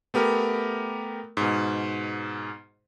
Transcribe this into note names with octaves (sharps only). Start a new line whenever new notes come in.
A3 B3 G4 A#4
G#2 B2